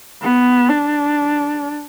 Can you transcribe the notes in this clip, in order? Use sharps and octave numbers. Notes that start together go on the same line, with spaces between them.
B3
D4